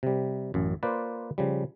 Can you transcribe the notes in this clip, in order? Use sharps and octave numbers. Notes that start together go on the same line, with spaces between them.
C3 G3
A1 F#2
A#3 F4 B4 C5 D5
C#3 F3 G3